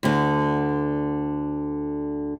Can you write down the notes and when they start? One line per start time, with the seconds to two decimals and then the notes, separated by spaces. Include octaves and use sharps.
0.03 D2 D3